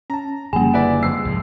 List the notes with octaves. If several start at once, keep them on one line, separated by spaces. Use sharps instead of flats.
C#4 A5 A#5
F#1 D3 F3 G3 A#3 G#4 G#5
E4 B4 D5
F2 G#3 E6 C7
C2 G#2 F3